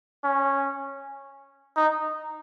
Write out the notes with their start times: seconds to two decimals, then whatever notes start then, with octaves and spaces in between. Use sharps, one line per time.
0.24 C#4
1.76 D#4